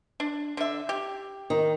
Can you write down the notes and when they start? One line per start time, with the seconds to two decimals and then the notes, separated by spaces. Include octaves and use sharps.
0.20 D4
0.57 D3 E5
0.89 G4
1.50 D#3